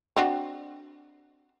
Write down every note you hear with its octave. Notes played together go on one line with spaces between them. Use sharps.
C4 D4 F#4